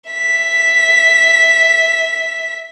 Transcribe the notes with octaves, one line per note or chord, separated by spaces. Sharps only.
E5 B6